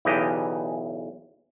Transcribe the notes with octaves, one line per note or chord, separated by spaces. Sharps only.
B1 E2 C#3 E3 G4 D#5